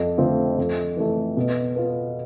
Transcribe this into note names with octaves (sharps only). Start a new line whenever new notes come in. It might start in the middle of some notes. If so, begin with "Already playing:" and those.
Already playing: F2
D3 A3 C4 F4
F2
E3 A3
B2
B3 F4